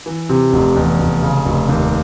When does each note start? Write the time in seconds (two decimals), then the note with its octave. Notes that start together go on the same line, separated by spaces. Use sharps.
0.06 E3
0.29 C3
0.53 F1
0.75 E2
0.99 F1
1.22 C#3
1.45 F1
1.68 D#2